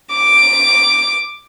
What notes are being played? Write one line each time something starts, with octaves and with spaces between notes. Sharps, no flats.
D6